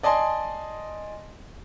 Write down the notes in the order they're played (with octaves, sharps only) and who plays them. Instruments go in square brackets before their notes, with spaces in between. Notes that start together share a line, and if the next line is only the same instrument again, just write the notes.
[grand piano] D5 D#5 G#5 A5 C6